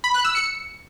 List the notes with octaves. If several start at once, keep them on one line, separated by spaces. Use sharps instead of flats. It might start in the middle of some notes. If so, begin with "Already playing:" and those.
B5
F#6
E6
C#7